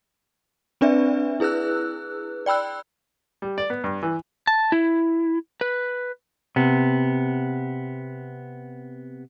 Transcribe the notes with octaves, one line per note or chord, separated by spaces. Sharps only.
C4 D4 B4 D5 E5
E4 G#4 B4 E6 F#6
D5 G5 B5 E6 F#6
G3
D5
B3
G2
E3
A5
E4
B4
C3 B3